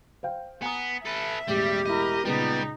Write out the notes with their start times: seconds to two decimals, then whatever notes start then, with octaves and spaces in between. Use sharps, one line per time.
0.23 C5 F5 G5
0.62 B3 G#5 A#5 D#6
1.06 A4 B4 E5
1.48 E1 A1 G3 G4
1.86 E4 A#4 D#5
2.25 C#2 A#2 G3 B3 D#4